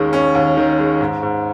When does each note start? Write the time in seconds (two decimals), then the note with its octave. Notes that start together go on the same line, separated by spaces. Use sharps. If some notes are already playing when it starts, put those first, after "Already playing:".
Already playing: D#2 D#3 G#3 C#4
0.13 C#4
0.35 D#2
0.57 D#3
0.78 G#3
1.01 G#2
1.23 G#2